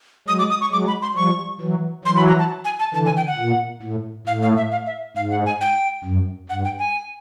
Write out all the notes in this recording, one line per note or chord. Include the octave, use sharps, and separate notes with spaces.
F#3 G#3 D#6
D6
D#6
C#6
F#3 G#3 D6
B5
C6
F3 G3 C#6
E3 F#3
E3 F#3 C6
B5
A#5
A5
G#5
A5
D3 E3 A5
G#5
G5
F#5
A#2
A2
A2 F5
F5
E5
F5
E5
G#2 F5
F#5
G#5
G5
F#2
G2 F#5
G5
G#5